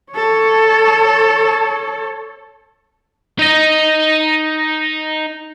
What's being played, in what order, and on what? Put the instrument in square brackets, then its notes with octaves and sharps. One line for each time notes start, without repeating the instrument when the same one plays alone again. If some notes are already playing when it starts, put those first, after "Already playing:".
[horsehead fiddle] A4 C#5
[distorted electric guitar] D#4 D#5